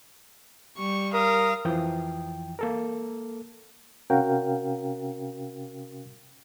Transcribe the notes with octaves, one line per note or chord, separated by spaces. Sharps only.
G3 C#6
A#4 F5 D#6
F2 E3 F3 G5
A#3 A4 A#4
C3 C#4 F#4 A#4 F5 G5